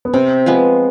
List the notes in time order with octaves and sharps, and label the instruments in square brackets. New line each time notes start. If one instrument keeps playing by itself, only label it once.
[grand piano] B3
[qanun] C3 [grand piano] C4
[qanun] F3 G#3 B3